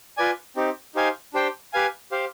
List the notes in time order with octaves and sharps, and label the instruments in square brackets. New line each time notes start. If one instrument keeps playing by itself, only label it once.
[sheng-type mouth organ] F4 B4 D5 G#5
C4 D#4 G4
D#4 G4 C5 F5 G#5
D4 G4 C5 G5
G4 B4 F5 G#5
G4 C5 F5